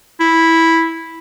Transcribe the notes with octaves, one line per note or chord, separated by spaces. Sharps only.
E4